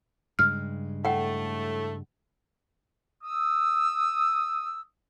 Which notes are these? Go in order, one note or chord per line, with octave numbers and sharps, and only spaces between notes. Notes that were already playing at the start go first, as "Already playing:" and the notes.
G2 C#3 G#3 F6
A2 A3 F#5 G5
D#6 E6